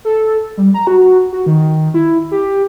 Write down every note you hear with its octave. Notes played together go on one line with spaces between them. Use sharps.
A4
G3
A#5
F#4
F#4
D#3
E4
G4